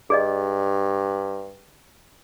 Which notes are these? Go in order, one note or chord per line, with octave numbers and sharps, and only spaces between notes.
G2 G#4 D5 D#5